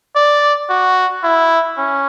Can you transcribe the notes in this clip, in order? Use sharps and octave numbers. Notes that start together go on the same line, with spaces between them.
D5
F#4
E4
C#4